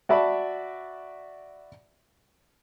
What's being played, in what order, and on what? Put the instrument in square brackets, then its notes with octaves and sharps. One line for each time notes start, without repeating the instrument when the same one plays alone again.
[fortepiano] F#4 D5 E5 A5 B5